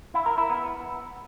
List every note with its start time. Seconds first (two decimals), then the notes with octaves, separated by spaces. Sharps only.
0.14 E4
0.26 A#4
0.38 E4
0.50 B3